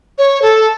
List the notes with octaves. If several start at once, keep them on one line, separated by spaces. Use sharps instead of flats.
C#5
A4